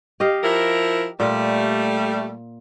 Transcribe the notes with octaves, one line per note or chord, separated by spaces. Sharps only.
G4 D#5 F5
F3 E4 A#4
A#2 G3 A3